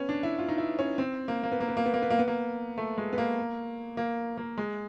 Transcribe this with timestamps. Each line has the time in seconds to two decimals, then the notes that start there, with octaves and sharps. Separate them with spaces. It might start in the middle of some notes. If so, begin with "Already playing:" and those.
Already playing: B3 C#4
0.09 D4
0.23 E4
0.39 F4
0.49 D#4
0.58 E4
0.79 C#4
0.98 C4
1.28 A#3
1.43 A#3
1.52 B3
1.60 A#3
1.68 B3
1.77 A#3
1.86 B3
1.94 A#3
2.02 B3
2.10 A#3
2.19 B3
2.28 A#3
2.78 A3
2.98 G#3
3.13 B3
3.18 A#3
3.97 A#3
4.38 A#3
4.58 G#3